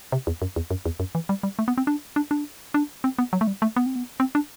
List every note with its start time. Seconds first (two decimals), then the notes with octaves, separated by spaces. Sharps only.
0.12 C3
0.27 E2
0.42 F#2
0.56 E2
0.71 F#2
0.86 E2
1.00 F#2
1.15 E3
1.29 G3
1.43 G3
1.59 A3
1.68 B3
1.78 C4
1.87 D4
2.16 D4
2.31 D4
2.74 D4
3.04 C4
3.19 B3
3.33 F#3
3.41 A3
3.47 G3
3.62 A3
3.76 B3
3.86 C4
3.96 B3
4.20 C4
4.35 D4